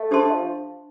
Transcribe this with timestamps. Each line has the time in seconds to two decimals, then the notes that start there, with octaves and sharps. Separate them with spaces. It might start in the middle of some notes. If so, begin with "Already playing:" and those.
Already playing: A3
0.11 D4 G4 C5 A5 C6
0.31 F3